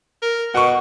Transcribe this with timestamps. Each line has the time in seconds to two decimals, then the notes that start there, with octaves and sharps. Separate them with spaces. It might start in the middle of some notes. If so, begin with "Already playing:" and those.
0.22 A#4
0.54 B2 F#5 C#6